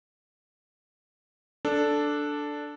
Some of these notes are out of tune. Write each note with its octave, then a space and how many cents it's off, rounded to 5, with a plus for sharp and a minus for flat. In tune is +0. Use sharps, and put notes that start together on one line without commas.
D4 +0 A4 +0